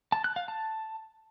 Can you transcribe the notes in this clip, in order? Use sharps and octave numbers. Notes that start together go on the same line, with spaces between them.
A5
F#6
F5
A5